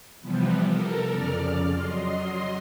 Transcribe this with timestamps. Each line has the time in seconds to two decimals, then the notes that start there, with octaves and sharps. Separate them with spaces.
0.21 C3 E3 F3 G3 B3
0.67 A4 A#4
1.11 F2 C#3 D5 F6
1.73 F#3 D#5 C6